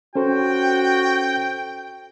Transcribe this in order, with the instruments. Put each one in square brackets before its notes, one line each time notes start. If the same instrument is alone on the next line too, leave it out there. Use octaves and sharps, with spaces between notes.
[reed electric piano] C#4 A4 C5 [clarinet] F#4 [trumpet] G5